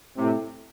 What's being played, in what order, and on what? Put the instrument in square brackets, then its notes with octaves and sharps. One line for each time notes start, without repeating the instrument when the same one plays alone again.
[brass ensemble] A2 C3